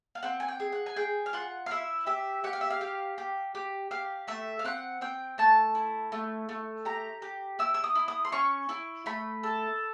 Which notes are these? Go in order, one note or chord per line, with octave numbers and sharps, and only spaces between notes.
F5
C4 F#5
G#5
G5
G#4
F#5
G#5
G#4 G5
F5
F4 F#5
F5
E4 E5
G4 E5
G4 F#5
F5
E5
F5
G4
G4
G4
G4 F5
A3 E5
F5
C4 F#5
C4 G5
A3 A5
E4
A3
A3
G4 A#5
G4
E4 E6
E6
D#6
E4
D#6
C6
C#4 C#6
E4 C#6
A3 B5
A4